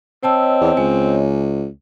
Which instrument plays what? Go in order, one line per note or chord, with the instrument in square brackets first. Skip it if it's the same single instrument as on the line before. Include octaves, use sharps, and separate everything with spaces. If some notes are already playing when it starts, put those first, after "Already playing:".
[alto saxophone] C4 [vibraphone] C#5 D#5 [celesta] G5 A5 E6
[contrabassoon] E2
[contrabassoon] C#2 [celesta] G#5